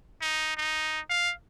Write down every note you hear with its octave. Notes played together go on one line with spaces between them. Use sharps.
D#4
D#4
F5